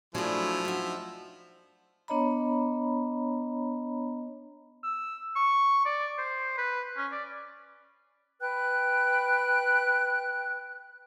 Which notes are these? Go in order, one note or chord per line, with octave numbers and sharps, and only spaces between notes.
F3 F#3 A3 D4 E4 G#4
D#4 F#4 E5
B3 D4 C#5 D#5 A#5 B5
E6
C#6
D5
C5
B4
C#4
D5
B4 G5 F#6